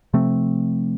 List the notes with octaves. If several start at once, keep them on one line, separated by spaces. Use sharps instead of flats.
C3 F3 A3 C4